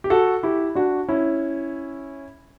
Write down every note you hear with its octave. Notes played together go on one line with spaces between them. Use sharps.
G4
F#4 A4
E4 G4
D4 F#4
C#4 E4